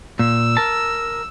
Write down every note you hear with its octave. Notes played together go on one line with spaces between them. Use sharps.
A#2 E6
A#4 A5